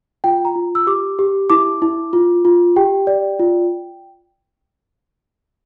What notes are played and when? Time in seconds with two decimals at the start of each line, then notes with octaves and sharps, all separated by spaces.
0.24 F4 G5
0.45 A#5
0.56 F4
0.75 E6
0.87 G4 D6
1.19 G4
1.50 E4 D6
1.82 E4
2.13 F4
2.45 F4
2.76 G4 G5
3.07 D5
3.39 F4